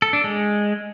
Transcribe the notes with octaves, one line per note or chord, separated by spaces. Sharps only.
A4
D4
G#3